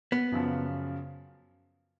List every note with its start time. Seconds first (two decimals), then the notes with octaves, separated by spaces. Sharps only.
0.12 B3
0.32 F#2 C#3 F3